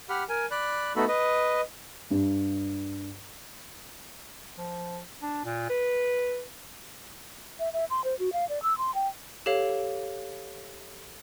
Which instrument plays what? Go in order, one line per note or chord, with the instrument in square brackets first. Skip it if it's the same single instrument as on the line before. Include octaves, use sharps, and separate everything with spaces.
[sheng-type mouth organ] G4 F#5 B5 F6
A#4 G#5
D5 B5 F#6
A3 B3 D#4 F#4 A4 B5
B4 D#5
[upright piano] G2
[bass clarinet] F3
D4
A#2
B4
[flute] E5
E5
C6
C5
F#4
F5
D5
E6
C6
G5
[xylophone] G4 A4 C#5 F5